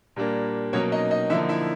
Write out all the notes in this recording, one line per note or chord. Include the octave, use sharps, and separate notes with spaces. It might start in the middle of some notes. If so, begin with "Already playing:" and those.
A#2 G3 A#3 D4
B2 F#3 A#3 C#4 C#5
D#4 D#5
D#4 D#5
D3 F3 A#3 D#4 E4 E5
E4 E5